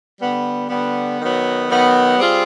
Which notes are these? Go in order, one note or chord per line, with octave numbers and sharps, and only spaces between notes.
D3 G3 B3
D3 G3 B3
D#3 F#3 B3
D#3 F#3 B3
G3 C4 F4 G#4